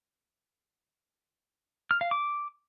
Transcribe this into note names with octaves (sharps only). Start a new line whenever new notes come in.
F6
F5
D6